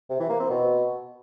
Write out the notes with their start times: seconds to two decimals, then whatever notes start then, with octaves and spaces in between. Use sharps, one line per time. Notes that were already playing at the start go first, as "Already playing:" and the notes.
0.10 C3
0.20 E3
0.30 A#3
0.40 C4
0.50 B2